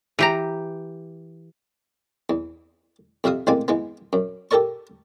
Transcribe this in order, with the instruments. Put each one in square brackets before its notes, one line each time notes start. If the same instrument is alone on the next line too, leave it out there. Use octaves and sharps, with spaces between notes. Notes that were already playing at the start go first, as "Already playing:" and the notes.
[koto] E3 G4 A#5
[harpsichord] E2
F2 C3 E5 F5 D#6
A1 G#3 A#3 C4 D5 G#5
E3 G#3 B3
F#2
G4 A4 A#4 D5 C#6